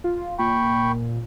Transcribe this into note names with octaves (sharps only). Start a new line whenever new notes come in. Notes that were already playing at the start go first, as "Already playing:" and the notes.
F4
A#2 G5 B5 C#6